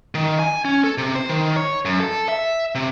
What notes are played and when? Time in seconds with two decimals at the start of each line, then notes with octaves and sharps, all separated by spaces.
0.15 D#3
0.39 G#5
0.65 C#4
0.84 A4
0.98 C3
1.15 C5
1.29 D#3
1.56 C#5
1.85 F#2
2.00 A4
2.29 E5
2.75 C3